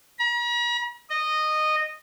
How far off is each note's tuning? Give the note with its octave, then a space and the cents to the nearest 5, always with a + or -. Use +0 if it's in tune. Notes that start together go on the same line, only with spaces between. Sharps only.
A#5 +45
D#5 -15